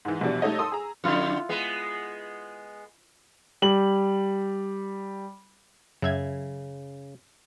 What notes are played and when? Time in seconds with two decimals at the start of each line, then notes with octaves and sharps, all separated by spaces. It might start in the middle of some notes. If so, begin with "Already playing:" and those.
0.05 G#2 E3
0.21 A#1 E2 B2 G3 D4
0.42 G3 A3 D#4 A4 C#5 D#5
0.59 A4 C6 D#6 E6
0.72 G#4 A#5
1.04 F2 D3 E4 F4 F#5
1.49 G#3 B3
3.62 G3 F#7
6.02 F#2 C#3 E5 G#6